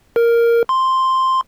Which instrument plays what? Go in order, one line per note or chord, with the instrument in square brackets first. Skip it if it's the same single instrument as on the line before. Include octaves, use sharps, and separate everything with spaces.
[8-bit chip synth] A#4
C6